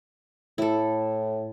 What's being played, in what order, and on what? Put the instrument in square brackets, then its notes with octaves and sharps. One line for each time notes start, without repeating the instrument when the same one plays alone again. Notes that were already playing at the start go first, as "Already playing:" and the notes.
[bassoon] A2 [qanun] E4 A4